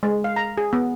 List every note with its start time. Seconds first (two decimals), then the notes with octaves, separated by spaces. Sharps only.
0.03 G#3
0.24 F5
0.36 A#5
0.58 G#4
0.73 B3